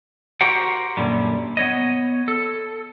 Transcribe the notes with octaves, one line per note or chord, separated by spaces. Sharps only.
F#4 G4 A#4 C5 F#5
F#2 A#2 D3 G3
B3 C#5 D#5
A4